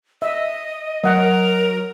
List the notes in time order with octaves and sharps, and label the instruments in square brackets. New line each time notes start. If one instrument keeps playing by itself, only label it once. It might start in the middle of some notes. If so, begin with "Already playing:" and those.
[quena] D#5 [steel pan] E5
[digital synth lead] F#3 [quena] A#4 [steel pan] D#5 F#5